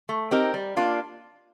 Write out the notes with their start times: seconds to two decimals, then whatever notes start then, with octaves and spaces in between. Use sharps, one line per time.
0.09 A3
0.31 C4 D#4 G4 A#4
0.54 G3
0.77 A#3 D4 F4